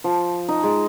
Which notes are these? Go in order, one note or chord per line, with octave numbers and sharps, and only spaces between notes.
F3
D#4
G#3